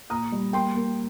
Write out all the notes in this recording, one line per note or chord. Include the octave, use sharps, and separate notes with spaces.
A#2 A#5 D#6
G3
A#3 G5 C6
A#3